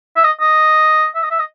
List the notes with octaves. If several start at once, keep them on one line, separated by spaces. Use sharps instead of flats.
E5
D#5
D#5
E5
D#5
E5
D#5